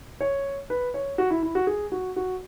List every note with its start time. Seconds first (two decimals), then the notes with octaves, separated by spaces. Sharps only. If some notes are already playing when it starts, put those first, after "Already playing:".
0.21 C#5
0.70 B4
0.94 C#5
1.18 F#4
1.30 E4
1.43 E4
1.55 F#4
1.67 G#4
1.92 F#4
2.16 F#4